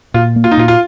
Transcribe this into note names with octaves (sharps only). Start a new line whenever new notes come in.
A#2 F4
A#3
F4
D#4
A#2 F4
F4